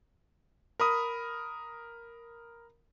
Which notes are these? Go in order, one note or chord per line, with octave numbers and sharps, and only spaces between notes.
A#4 B5 D#6